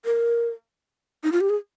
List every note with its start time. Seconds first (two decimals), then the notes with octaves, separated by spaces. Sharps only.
0.05 A#4
1.24 D#4
1.32 F4
1.41 G4
1.50 G#4